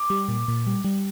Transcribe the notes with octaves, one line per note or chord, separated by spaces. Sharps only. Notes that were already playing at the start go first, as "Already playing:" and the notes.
Already playing: D6
G3
A#2
A#2
G3
G3